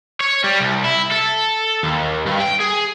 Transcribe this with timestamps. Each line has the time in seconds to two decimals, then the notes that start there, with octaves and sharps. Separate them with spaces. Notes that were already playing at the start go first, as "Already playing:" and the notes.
0.21 C#5
0.44 G3
0.60 C2
0.84 E4
1.11 A4
1.83 D#2
2.26 G2
2.40 G5
2.60 G#4